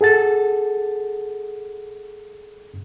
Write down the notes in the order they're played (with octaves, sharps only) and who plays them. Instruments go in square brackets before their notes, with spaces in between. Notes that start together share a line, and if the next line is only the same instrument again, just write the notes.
[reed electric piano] G#4 A4 F#5 A6